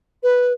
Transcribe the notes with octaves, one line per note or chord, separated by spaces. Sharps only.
B4